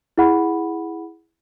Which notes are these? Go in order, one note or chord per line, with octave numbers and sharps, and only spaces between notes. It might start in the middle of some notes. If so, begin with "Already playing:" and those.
E4 G#4 F#5 B5